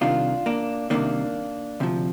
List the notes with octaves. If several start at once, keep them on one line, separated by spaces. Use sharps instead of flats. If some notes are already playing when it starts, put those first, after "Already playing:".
C2 C3 D#3 D4 F4
A#3 D4
C2 C3 D#3 A#3 D4
D2 C3 F3